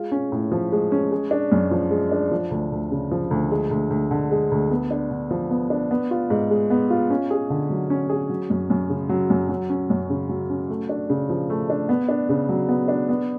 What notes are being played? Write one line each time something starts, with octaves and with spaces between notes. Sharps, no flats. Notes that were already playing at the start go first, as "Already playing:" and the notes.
Already playing: G#3 F4
C#4
A2
F3
G#3
C#4
G#3
D4
F#2
F3
G#3
D4
F3
D2
D2
C#3
F3
D2
G#3
D2
D2
D3
G#3
D2
B3
D4
D3
F3
B3
D4
B3
F4
G#2
G#3
B3
F4
C#4
G#4
D3
F#3
C#4
G#4
F#3
F#2
F#2
C#3
F#3
F#2
F#3
C#4
F#2
C#3
F#3
C#4
A3
D4
C#3
F3
A3
D4
B3
D4
C#3
F#3
B3
D4
B3